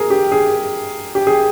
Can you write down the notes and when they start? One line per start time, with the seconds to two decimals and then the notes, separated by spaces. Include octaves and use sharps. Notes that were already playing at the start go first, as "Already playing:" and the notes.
Already playing: G#4 A#4
0.10 G4
0.32 G#4
1.15 G4
1.27 G#4